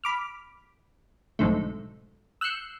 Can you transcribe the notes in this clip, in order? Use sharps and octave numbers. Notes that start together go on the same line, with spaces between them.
B5 D6 F6
B1 F2 G#2 D3 A3
E6 F#6 G6 C7 C#7